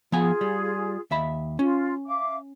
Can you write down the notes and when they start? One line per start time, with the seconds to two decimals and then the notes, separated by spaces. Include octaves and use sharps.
0.12 F3 B3 F4 G#4 G#5
0.41 G3
1.11 D#2 E5 B5
1.59 C#4 F4
2.07 E5 F5 D6